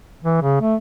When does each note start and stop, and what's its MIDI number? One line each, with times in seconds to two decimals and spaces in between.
0.24 0.38 52
0.41 0.61 49
0.61 0.75 57